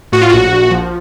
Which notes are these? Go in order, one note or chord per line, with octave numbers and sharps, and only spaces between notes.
A2 F#4
F4
A#1 F#4
A#1
F3